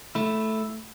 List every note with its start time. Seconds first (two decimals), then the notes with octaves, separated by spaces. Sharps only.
0.15 A3 E4